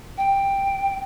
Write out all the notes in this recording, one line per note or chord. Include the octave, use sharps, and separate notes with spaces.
G5